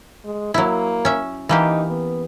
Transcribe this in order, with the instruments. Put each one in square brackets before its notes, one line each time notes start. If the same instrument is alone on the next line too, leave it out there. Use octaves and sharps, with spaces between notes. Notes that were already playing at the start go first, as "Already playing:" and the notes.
[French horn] G#3
[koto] F#3 E4 [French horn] A#3
[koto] C#4 E5
[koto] E3 A#3 G4 [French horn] D#4
[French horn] B3